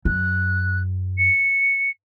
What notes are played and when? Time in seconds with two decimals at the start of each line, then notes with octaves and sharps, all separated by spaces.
0.05 F#2 F#6
1.18 C#7